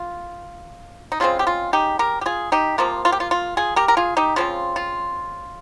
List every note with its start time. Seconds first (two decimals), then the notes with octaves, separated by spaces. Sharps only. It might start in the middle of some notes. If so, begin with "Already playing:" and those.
Already playing: F4
1.12 D#4
1.20 C#3 G#3 C4 F4
1.39 G4
1.47 F4
1.73 D#4 G4
1.99 G4 A#4
2.21 G4
2.26 F4 G#4
2.52 D#4 G4
2.78 C3 F3 A#3 F4
3.05 F4
3.12 G4
3.20 F4
3.31 F4
3.57 F4 G#4
3.76 G4 A#4
3.88 A#4
3.97 F4 G#4
4.17 D#4 G4
4.36 C#3 F3 C4 F4
4.76 F4